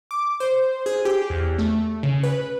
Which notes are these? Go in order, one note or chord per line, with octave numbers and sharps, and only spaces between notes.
D6
C5
G#4
G4
E2
A3
C#3
B4